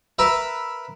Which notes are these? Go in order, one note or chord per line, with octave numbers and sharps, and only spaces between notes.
A#4 B4 E5